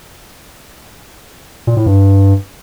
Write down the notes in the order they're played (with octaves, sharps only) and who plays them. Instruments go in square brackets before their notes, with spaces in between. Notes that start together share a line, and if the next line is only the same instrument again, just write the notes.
[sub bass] A#2
A2
G2